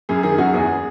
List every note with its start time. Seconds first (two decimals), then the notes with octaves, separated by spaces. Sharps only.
0.09 F#2 G#4
0.23 D#3 G#4
0.38 F#2 F#4
0.53 E2 G#4